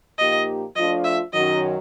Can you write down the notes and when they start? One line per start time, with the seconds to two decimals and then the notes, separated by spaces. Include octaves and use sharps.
0.18 A#2 F3 A#3 D#4 G4 D#5
0.76 F3 A3 D4 F4 D#5
1.04 E5
1.33 F#2 D#3 F#3 D#5